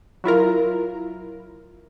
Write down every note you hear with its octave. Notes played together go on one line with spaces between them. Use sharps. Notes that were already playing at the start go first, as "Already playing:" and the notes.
F#3 E4 F4 A#4